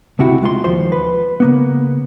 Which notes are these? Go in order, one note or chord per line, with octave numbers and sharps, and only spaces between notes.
C#2 C3 E4 F#4 G5
G#3 F4 C6
D#2 F3 C5 C6
B4
C#3 A#3 B3